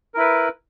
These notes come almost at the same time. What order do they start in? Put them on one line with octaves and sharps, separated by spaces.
A#4 E4 B4